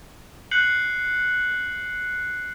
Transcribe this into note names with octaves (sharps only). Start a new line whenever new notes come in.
F#6 G6 C7 C#7 F#7